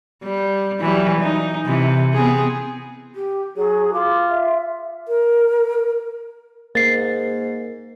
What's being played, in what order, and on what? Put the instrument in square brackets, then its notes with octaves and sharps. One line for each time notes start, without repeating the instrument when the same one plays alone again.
[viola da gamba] G3
E3 F#3 G3
D#4
C3 E3
B3 C4 G#4
[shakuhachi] G4
[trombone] F#3 [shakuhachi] G#4
[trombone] F4 [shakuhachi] D6
[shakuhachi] E5
[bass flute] A#4
[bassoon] G#2 [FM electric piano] A#3 [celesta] A6 C7